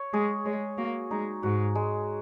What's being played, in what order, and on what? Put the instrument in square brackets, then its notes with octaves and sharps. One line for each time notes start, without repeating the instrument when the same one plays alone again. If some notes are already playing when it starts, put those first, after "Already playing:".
Already playing: [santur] C#5
[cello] G#3 [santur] G#4
[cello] G#3 [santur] C#5
[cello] A#3 [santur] F#4
[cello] G#3 [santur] D#4
[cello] G#2 [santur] F#4
[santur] G#3